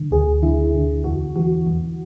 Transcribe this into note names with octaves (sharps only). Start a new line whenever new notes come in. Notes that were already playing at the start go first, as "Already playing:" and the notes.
Already playing: D3
D2 G#4
D3 E4
D3
E2 F#4
E3 F#4
E2